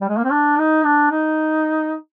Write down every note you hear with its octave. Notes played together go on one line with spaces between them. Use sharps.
G3
G#3
A#3
C4
D4
D#4
D4
D#4